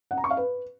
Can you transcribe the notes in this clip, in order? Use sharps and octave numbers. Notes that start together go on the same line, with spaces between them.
F#5
A#5
C#6
F5
B4